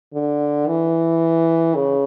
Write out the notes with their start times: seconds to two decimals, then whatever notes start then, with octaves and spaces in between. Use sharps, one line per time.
0.14 D3
0.67 E3
1.75 C#3